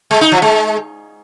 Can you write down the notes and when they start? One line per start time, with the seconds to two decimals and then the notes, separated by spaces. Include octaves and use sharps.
0.11 G#3
0.21 D#4
0.32 F3
0.42 G#3